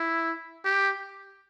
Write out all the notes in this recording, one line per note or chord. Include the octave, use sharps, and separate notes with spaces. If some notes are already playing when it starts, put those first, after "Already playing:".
Already playing: E4
G4